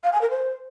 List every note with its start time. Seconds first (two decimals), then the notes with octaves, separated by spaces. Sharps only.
0.04 F5
0.12 G#5
0.21 A#4
0.30 C5